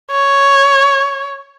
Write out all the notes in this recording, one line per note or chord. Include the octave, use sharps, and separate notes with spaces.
C#5